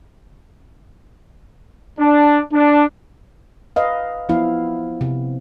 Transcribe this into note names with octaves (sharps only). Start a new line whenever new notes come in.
D4
D4
B4 D#5 F5
F3 B3 E4 F5
C3